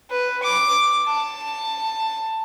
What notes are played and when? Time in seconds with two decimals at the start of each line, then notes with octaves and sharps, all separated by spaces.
0.10 B4
0.43 D6
1.07 A5